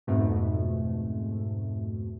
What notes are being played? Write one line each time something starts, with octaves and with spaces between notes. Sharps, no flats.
F2 G#2 B2 A3